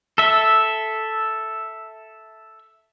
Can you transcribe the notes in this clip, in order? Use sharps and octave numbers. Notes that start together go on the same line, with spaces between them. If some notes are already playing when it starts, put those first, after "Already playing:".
A4 E5